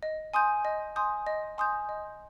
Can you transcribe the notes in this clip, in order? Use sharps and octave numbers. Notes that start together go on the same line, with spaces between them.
D#5
G#5 C6 D#6 G6
D#5
G#5 C6 D#6 G6
D#5
G#5 C6 D#6 G6
D#5